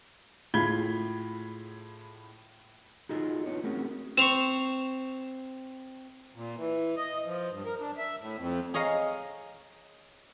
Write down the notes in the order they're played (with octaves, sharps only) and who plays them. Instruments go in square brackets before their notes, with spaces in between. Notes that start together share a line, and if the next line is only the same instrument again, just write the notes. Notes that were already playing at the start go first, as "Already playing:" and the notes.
[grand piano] A2 F4 G#4 B5 G#6 G7
[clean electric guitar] D#4 F4 F#4 G#4 A4 D#5
B3 D4 D#4 F4 C#5
A3 C4 C#4 F#4 G#4 A#4
[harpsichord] C4 C5 C#6 [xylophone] E7 F7
[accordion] A#2
E3
D#5
F3
G2
A#4
D4
E5
A2
F2
[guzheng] G#4 C#5 D#5 F5 A#5